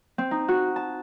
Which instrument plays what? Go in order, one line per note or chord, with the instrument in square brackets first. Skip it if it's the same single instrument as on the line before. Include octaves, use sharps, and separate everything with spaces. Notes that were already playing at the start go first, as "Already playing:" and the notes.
[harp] C4
D#4
F#4
A5